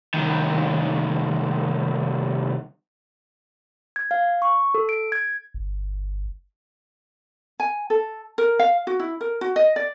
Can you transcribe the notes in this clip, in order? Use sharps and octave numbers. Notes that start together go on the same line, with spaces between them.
C2 D#3
G#6
F5
C#6
A4
D7
G#6
G1
G#5
A4
A#4
F5
F#4
E4
A#4
F#4
D#5
D5